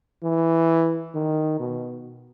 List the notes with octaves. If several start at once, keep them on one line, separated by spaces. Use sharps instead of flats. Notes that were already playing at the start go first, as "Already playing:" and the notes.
E3
D#3
B2